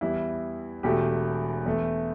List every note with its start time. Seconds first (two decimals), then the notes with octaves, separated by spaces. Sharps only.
0.01 E2 E3 G3 E4
0.83 E1 E2 B2 A3 G4
1.66 E2 E3 A3